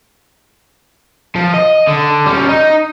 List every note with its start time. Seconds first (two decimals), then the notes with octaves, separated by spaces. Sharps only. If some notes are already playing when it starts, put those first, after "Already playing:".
1.36 F3
1.54 D#5
1.88 D3
2.26 G3 C#4
2.49 D#4